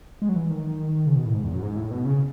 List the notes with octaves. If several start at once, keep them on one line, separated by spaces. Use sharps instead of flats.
G#3
F#3
E3
D#3
C#3
B2
A2
G#2
E2
F#2
G#2
A2
B2
C#3